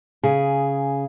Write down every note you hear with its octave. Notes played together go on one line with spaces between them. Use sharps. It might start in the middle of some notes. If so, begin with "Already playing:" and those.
C#3 G#4